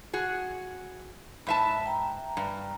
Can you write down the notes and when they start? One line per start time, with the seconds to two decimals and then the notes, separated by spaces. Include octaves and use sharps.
0.13 F#4 G#4
1.47 G#2 E5 A5 B5
1.86 G5 A#5
2.37 G2